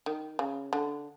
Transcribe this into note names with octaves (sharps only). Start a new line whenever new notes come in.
D#3
C#3
D3